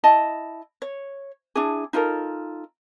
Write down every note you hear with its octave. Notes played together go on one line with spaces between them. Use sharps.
E4 D#5 A5
C#5
D4 E4 G#4
D#4 F4 A4 A#4